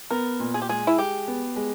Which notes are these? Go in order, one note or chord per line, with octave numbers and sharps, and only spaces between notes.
B3 A#4
A#2
G#4
G4
G#3 G#4
E4
G#3 G4
B3
G#3